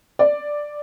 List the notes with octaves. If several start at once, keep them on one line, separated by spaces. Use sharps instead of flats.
D5